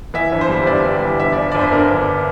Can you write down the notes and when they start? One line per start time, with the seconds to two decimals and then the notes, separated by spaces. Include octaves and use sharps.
0.14 E3 E5
0.32 G1
0.41 C5
0.49 G3
0.62 C5
0.66 G1 D5
0.85 G3
1.02 E3
1.20 G1 E5
1.33 D5
1.37 G1
1.52 D5
1.55 G1 C5
1.72 D3 A#4
1.90 G1